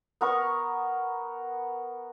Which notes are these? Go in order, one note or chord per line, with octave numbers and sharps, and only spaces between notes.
B3 A#4 C#6